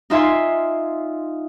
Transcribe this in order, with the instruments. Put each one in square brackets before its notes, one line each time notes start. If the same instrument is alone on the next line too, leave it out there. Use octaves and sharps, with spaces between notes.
[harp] D#4 F4 E5 G#5 C6